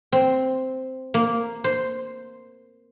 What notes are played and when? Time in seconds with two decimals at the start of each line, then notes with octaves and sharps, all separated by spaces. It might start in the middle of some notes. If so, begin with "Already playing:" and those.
0.12 C4
1.14 A#3
1.64 C5